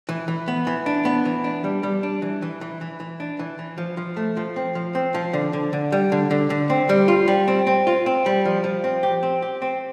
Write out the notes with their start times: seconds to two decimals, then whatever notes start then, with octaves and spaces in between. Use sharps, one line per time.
0.09 E3
0.28 E3
0.48 B3
0.67 E3
0.86 D4
1.05 B3
1.25 E3
1.44 D4
1.64 G3
1.83 G3
2.03 D4
2.22 E3
2.42 E3
2.61 E3
2.81 E3
3.00 E3
3.20 D4
3.39 E3
3.59 E3
3.78 F3
3.97 F3
4.17 A3
4.37 F3
4.56 C4
4.75 F3
4.95 C4
5.14 F3
5.33 D3
5.53 D3
5.73 D3
5.92 G3
6.12 D3
6.31 D3
6.50 D3
6.70 C4
6.89 G3
7.08 F4
7.28 G3
7.48 C4
7.67 C4
7.87 F4
8.06 C4
8.26 G3
8.45 F3
8.64 F3
8.84 C4
9.03 G4
9.23 C4
9.42 G4
9.62 C4